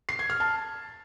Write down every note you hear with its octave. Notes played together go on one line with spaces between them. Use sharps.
C7
G#6
F6
A5